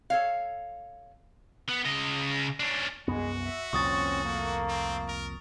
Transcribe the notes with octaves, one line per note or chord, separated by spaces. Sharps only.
A4 C#5 F5
B3
C#3 D#5
C#4 D4
C2 F#2 G#3 B3 F#4
E5
C2 F2 A#2 C4 C#4 C#6 D#6 A6
A3 A#3
C4
A#4